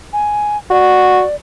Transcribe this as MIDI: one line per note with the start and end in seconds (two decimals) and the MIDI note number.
0.13 0.57 80
0.71 1.23 66
0.71 1.35 74